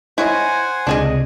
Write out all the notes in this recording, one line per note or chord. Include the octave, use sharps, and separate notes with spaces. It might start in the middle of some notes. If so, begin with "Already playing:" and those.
E4 C5 C#5 D#5 F#5 G#5
C#2 C3 D4 G#4 D#5